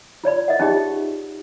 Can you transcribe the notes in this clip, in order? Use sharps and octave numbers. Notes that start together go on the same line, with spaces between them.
F4 C#5 D5 B5
A#4 D#5 E5 F#5
C#4 D#4 F4 G4 G#4 D#5